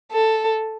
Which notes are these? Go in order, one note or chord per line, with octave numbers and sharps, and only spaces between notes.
A4